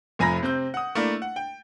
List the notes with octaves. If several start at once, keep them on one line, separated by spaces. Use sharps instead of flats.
F1 F2 G#5 A#5 B5 A#6
C3 C4 G6
F#5 D#6
A3 A#3 D4 E4
F#5
G5